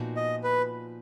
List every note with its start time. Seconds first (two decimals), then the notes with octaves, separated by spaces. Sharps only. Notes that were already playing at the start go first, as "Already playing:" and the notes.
Already playing: A#2 F3 B3 D#4 F#4
0.17 D#5
0.43 B4